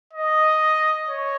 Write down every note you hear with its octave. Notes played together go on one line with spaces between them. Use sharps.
D#5
C#5